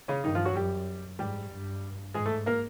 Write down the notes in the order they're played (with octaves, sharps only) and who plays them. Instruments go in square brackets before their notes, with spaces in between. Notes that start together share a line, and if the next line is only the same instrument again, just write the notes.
[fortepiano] C#3 C#4
[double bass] G2 [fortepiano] D#3 D#4
[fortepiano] F3 F4
F#3 F#4
[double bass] F#2 [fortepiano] G3 G4
[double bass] G#2 [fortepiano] G3 G4
[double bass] G2
[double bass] G#2 [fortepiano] G#3 G#4
[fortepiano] A3 A4
A#3 A#4